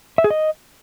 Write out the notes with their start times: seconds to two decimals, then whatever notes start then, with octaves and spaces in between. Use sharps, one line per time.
0.18 E5
0.24 G#4
0.30 D#5